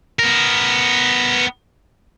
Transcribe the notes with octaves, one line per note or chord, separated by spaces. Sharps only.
B3 A#4